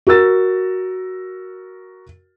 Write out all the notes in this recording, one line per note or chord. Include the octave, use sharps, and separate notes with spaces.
F#4 A#4 E6 A6